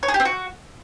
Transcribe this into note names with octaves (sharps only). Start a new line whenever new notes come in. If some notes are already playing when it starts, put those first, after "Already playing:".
C#5
G#4
G4
C4
F#4